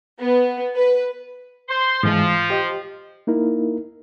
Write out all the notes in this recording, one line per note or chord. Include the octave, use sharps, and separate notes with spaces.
B3
B4
C5 C6
G#2 E3 F3 G#3
G4 D#5
A#3 D#4 E4 A#4